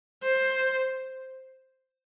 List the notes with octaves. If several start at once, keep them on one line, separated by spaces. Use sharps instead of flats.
C5